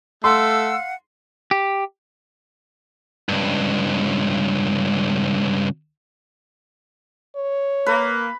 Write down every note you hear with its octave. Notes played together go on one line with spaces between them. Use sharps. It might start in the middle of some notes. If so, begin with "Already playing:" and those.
A3 F5 F#5 C6 E6
G4
C#2 G2
C#5
A#3 B4